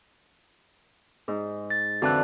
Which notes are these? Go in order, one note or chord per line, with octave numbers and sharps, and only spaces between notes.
G#2
A6
F2 D3 E3 F#4 A5 F#6